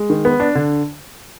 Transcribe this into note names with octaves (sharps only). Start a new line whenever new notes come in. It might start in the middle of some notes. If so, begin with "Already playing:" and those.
Already playing: G#3
D#3
B3
D4
D3